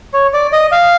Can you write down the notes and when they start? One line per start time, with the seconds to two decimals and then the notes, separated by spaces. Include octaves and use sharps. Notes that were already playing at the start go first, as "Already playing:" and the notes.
0.14 C#5
0.33 D5
0.53 D#5
0.72 F5